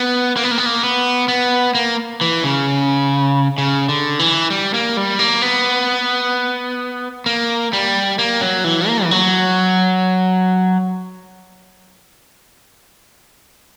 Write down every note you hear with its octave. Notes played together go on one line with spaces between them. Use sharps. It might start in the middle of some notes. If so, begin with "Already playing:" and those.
Already playing: B3
A#3
B3
A#3
B3
A#3
B3
B3
A#3
E3
C#3
C#3
D3
E3
G3
A#3
G3
A#3
B3
A#3
G3
A#3
F#3
E3
A#3
E3
F#3